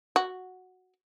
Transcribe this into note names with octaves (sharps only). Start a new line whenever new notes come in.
F#4